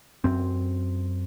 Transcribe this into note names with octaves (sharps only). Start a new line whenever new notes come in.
F#2 C4